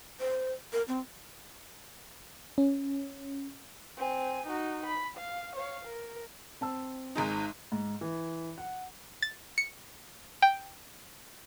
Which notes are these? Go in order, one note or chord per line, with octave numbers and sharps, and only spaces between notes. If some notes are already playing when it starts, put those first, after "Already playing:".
C5
A#4
C4
C#4
C4 G#5
D#4 F#4
B5
F5
C#5 F5
A#4
C4 A5 E6
G#1 G#3 D#4
G#2
E3
F#5
A6
C#7
G5